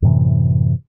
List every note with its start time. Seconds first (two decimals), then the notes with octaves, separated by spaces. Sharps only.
0.02 F#2 A2 C3 E3